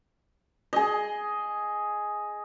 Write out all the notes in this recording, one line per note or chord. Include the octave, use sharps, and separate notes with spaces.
G#4 D#5